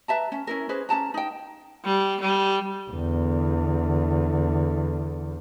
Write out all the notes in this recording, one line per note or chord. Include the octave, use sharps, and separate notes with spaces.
B4 E5 A5 A#5
C#4
C#4 E4 A#4
C#4 G#4 B4 C5
C#4 A4 A5 A#5
D#4 G5
G3
G3
E2 D3